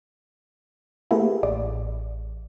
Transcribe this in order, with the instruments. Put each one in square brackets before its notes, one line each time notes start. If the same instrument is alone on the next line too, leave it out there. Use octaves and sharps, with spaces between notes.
[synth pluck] A3 A#3 E4 [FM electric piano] G4 G#4 B4
[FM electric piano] A1 [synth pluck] D5